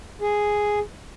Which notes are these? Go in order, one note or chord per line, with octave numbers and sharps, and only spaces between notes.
G#4